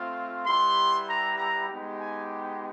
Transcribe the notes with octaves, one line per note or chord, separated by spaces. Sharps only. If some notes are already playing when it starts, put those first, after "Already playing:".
Already playing: A3 C4 F4
G3 B3 E4 G4 C6
A#5
A#5
G#3 B3 D#4 G4
G#5